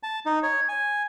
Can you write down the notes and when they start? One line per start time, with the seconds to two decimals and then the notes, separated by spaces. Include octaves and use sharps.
0.03 A5
0.26 D#4
0.43 C#5
0.69 G#5